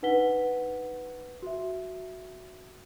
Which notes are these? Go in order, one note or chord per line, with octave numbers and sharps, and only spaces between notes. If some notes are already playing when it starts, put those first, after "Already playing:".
D4 D#4 B4 F#5 B6 G7
F#4 E5